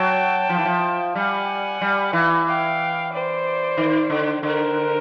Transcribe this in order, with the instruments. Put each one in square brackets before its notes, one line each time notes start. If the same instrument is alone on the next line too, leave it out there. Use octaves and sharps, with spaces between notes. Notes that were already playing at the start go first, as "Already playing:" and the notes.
Already playing: [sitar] F#3 [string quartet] G5 A5
[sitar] F3
E3
F3
[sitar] G3 [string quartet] F#5 G#5
[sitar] G3
E3
[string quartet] F5 G5
C5 D5
[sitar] D#3
D3
[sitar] D3 [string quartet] A#4 C5